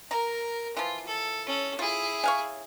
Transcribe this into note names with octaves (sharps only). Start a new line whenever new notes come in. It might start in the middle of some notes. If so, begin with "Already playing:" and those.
A#4 A#5
E3 F3 F4
A4
C#4 A4
E4 F4 G#4
C#5 F5 G#5